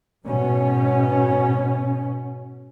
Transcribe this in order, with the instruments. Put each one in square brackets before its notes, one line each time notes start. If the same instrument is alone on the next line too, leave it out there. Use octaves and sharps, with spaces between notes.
[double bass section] G#2 B2 C#4